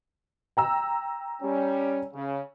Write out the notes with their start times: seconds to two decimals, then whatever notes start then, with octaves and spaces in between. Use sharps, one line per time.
0.57 G5 A#5 E6
1.42 G3 C#4
2.14 C#3